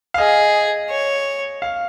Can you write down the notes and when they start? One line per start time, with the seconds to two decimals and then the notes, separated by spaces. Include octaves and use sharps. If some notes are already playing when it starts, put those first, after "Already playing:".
0.14 F5
0.18 G#4 D#5
0.90 C#5
1.62 F5